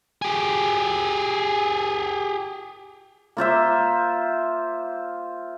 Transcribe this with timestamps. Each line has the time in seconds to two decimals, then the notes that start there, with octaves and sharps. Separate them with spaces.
0.22 G4 G#4
3.37 A#3 F4 C5 E5